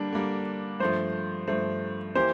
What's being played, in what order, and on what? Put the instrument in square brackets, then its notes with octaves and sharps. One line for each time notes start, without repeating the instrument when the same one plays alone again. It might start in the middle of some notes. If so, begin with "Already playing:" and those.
Already playing: [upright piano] D3 G3 A#3 [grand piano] D4
[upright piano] D3 G3 A#3
[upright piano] G2 F3 A3 [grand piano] C5
[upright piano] G2 F3 A3 [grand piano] C5
[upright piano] E3 A#3 E4 G4 [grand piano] C5